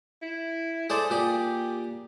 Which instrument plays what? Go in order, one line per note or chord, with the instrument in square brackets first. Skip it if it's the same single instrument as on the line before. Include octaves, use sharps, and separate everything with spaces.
[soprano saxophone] E4
[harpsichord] G#4 C5 D5 [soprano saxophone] A4
[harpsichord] A#2 G#4 D6 [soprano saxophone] G4